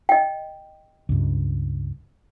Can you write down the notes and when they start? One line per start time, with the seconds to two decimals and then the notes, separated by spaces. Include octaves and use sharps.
0.09 D#5 G5
1.09 C#2 G2